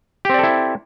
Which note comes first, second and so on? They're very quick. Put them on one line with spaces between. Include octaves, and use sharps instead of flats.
G4 C4 D5 A4 E4